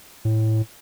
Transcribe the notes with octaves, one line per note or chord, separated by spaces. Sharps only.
A2